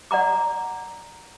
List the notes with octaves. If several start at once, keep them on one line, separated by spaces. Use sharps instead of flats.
D5 F#5 A#5 D6